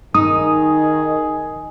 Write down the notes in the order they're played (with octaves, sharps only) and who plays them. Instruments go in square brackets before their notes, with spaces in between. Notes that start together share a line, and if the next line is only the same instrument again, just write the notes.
[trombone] D#3 [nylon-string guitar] D#4 [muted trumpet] G#4 [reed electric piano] D#6